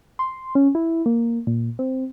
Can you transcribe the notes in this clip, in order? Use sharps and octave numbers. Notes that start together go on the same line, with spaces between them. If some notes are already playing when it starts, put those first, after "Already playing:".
C6
C#4
E4
A#3
A#2
C4